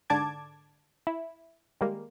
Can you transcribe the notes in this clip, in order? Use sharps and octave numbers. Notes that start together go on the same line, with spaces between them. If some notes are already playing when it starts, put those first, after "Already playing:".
G#2 D3 D4 A5 D6 G#6
E4
D#3 G3 G#3 A#3